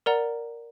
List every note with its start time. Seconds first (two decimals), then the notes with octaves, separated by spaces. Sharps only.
0.06 A#4 D5 F#5 A#5